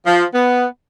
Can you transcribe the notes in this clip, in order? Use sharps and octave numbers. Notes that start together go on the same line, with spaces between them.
F3
B3